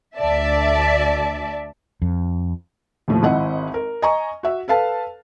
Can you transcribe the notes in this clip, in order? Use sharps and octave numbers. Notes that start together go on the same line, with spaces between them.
D2 D5 E5 A5
F2
D#2 A2 F3
G#1 C4 E4 D#5 F#5
A#4
D#5 G#5 A#5 C#6
F#4 E5
A4 B4 F5 A5